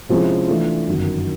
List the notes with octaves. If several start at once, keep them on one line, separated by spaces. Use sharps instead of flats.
C3 F3 G#3 C#4 E4
E3 A3 D4 F4
G1 F#2 D#3 F#3